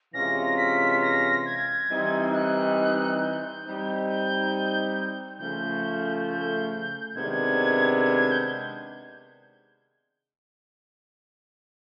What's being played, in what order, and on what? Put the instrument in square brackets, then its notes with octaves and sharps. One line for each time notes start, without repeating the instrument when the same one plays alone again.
[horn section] C3 E3 G#3 C#4 F4 [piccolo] A#6
[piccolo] B6
A#6
G#6
[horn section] E3 G3 C4 D#4
[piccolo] F#6
G6
[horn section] G3 C4 D#4
[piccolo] G6
[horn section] C#3 F3 A3 [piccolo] G6
[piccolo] G6
[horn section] C3 D#3 G#3 B3 D4 [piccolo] G#6
[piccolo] G#6
G#6
G6